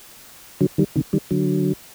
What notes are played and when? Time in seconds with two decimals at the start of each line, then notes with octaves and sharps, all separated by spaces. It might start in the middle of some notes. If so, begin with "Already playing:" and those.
0.61 D3 F#3
0.78 D#3 G3
0.96 C3 D#3
1.13 D#3 G3
1.31 D3 F#3